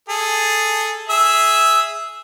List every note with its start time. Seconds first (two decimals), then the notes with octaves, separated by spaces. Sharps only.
0.09 G#4 A4
1.09 G#4 E5 E6